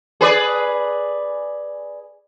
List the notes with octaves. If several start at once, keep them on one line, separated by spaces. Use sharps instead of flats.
G#4 B4 D5